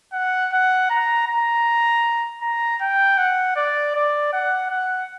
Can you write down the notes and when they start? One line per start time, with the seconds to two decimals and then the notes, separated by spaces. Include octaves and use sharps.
0.13 F#5
0.52 F#5
0.90 A#5
1.27 A#5
2.42 A#5
2.81 G5
3.18 F#5
3.56 D5
3.95 D5
4.33 F#5
4.70 F#5